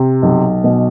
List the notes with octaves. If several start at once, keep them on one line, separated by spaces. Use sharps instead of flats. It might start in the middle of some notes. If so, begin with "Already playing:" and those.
Already playing: C3
B1
B2